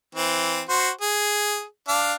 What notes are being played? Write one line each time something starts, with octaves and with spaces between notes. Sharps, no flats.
E3 C4
F#4 C5
G#4
D4 F5